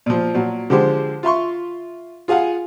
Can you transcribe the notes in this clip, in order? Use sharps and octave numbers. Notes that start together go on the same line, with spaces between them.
A#2 F3
A#2 F#3
D3 F3 G#3 G4 C5
F4 E5 C6 C#6
F4 G#4 F5 F#5 G#5